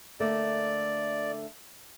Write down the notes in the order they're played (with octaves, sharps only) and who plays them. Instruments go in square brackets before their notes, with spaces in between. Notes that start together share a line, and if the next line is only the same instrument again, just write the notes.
[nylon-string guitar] D3 A3 A#3 [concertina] D5